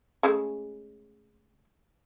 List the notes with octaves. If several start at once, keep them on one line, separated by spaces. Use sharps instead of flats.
C#3 G#3 A3